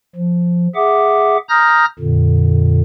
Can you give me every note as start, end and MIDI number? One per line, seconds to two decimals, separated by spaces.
0.15 0.67 53
0.75 1.37 68
0.75 1.37 76
0.75 1.37 78
0.75 1.37 86
1.49 1.85 82
1.49 1.85 87
1.49 1.85 89
1.49 1.85 91
1.49 1.85 94
1.99 2.82 41
1.99 2.82 46
1.99 2.82 50